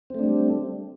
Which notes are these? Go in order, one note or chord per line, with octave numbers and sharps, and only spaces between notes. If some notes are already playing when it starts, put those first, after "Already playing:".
G3 A3 C4 D4